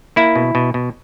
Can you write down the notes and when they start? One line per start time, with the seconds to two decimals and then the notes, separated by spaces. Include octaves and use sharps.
0.16 A#3 E4
0.36 B2
0.55 B2
0.74 B2